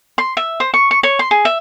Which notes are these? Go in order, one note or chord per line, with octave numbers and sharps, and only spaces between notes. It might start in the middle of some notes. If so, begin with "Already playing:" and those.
C6
E5
C5
C#6
C#6
C#5
C6
G#4
E5